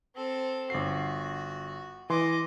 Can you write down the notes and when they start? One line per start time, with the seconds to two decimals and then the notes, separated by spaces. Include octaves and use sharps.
0.15 C4 A4
0.70 G1 F#4 C7
2.10 E3 D#5 C6 D6